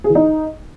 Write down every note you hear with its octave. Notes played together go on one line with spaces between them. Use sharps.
G#4
E3
D#4